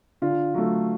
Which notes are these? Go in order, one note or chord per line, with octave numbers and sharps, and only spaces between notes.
D3 F4
F#3 A3